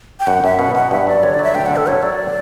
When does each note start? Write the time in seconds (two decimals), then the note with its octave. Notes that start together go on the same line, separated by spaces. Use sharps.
0.20 G5
0.27 F#2 F#5
0.43 F#2 E5
0.59 B2 F#5
0.75 B2 F#5
0.91 G2 E5
1.07 F#3 D5
1.23 D3 C#5
1.34 D5
1.39 F#3 E5
1.55 D2 G5
1.66 D3 F#5
1.76 A4
1.87 F#3 C#5
2.03 F#3 D5